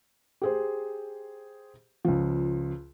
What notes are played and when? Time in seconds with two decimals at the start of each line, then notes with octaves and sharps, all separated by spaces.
0.41 G4 G#4 C5
2.05 C#2 F3